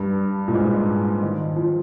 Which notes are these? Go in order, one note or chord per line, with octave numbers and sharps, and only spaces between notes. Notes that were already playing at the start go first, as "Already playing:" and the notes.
Already playing: G2
A#2
G#2
D#3
F3